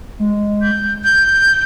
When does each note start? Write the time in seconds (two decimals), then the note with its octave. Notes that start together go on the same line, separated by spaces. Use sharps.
0.19 G#3
0.62 G6
1.04 G6